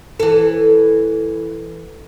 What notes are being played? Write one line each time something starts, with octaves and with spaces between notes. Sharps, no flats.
E3 A4